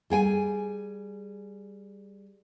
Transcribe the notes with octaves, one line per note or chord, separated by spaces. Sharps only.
G3 G#4 G5 G#5